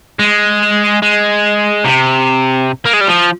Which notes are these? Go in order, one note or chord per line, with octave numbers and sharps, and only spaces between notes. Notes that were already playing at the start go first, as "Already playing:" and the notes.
G#3
G#3
C3
A#3
G#3
G3
F3